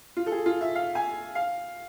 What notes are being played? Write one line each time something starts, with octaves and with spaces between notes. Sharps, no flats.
F4
A4
G#4
F4
E5
F5
G#5
F5